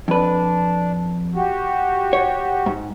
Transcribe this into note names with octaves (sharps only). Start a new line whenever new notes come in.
F2 D4 B4
F#4 G4
C#5
G#2